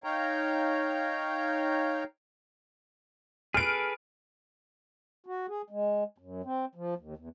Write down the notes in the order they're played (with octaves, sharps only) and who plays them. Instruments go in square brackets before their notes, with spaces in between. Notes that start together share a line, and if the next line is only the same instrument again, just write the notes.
[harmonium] D#4 C#5 F5 G5 A#5
[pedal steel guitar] G#4 A4 B4 [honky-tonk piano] F6 D7
[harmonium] F#4
G#4
G#3
F#2
C4
F3
D#2
E2